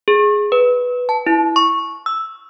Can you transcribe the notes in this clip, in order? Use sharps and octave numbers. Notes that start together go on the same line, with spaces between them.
G#4
B4
A5
E4
C#6
E6